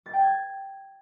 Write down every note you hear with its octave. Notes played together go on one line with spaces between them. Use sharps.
A6
G5
G#6